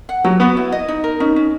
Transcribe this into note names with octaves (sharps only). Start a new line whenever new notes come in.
F#5
F#3 F#4
B3 F#4
E4
D#5
D#4
A#4
C#4 D#4
C#4